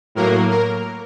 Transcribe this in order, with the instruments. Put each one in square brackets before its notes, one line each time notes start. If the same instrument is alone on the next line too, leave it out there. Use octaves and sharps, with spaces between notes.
[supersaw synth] A2 F#3 A#3 A#4
A#4